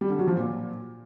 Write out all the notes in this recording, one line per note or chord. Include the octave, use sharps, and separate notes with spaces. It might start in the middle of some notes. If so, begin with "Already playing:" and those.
G3
D3
F#3
F3
A#2